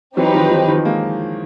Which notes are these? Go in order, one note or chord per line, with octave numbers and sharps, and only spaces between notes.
E3 F#3 C4 D#4 G4 B4
D#3 F3
D#3 F3
D#3 F3
G#3 A#3